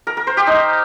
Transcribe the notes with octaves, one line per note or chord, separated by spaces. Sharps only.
A#4
A#4
C5
G4
D#4